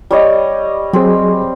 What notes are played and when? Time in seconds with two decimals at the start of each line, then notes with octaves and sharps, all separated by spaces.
0.11 G3 C#5 D#5
0.93 F#3 C4 G#4